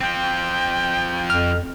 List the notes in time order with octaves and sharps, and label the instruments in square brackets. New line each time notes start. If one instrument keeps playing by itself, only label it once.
[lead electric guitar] F3 C4 [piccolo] G5
[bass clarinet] F2 [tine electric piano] F6